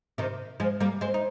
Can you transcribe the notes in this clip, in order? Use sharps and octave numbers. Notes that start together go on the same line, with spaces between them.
C3 D#3
F3 G#3
G3 A#3
G#3 C4
D#4